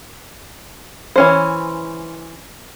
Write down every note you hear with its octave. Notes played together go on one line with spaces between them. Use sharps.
E3 C#4 C5